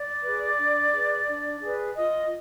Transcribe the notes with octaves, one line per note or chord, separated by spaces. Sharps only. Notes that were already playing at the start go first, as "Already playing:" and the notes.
Already playing: D5
G#4 B4
D4
G#4 B4
D4
G#4 B4
F4 D#5